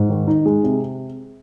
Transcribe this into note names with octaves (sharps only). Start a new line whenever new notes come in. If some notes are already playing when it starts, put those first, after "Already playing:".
Already playing: G#2
D#3
D#4
G#3
C3